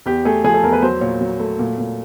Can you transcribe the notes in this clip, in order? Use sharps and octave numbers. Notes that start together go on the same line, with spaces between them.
E2 G4
A3 G#4
F3 G#4
A4
E2 A#4
B4
F#3 C5
A#2 C#5
F#3
A3
A#2
A#2